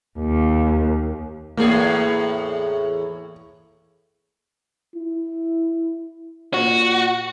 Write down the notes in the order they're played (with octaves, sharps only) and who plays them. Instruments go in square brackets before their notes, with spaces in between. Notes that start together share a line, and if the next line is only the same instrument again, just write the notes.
[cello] D#2
[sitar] E2 A2 G#4 [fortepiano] A#3
[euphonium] E4
[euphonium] A#2 [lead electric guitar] F#4